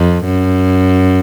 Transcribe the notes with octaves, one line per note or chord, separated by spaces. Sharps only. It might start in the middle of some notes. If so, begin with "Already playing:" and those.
Already playing: F2
F#2